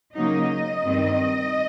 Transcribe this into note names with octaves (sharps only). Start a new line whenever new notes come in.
C#3 F#3 A#3 D#4 D#5
G2 D#3 G3 C4